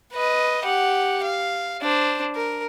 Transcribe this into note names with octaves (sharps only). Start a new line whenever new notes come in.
B4 D#5
G4 F#5
F5
D4 C5
A#4